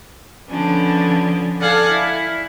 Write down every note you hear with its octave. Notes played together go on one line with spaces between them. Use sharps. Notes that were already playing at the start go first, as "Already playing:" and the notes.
D3 F3 B3 C#4 D4
A4 D5 F5 F#5 G#5
E4